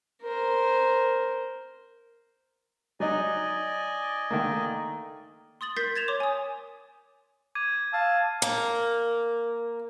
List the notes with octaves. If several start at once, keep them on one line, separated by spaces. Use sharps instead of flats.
A#4 C5
F#3 D#4 D5 D#5 G#5
D#3 A3 A#3
C6 D#6 A6 F#7
A#4 C6 G6 A6 B6 C7
G#6 A6 E7 F7
C#5 C6 D6
G#5 D#6
D6 G#6 D#7
F5 A5 E6
A#3